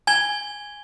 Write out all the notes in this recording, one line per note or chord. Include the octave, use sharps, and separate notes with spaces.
G#5 G#6 G7